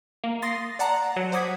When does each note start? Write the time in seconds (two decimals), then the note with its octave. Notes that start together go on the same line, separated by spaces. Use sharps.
0.24 A#3
0.42 C6 D#6 A6 A#6 C7
0.79 D5 F#5 A5 A#5
1.16 F#3
1.32 C5 F#5 D6 D#6 G#6 B6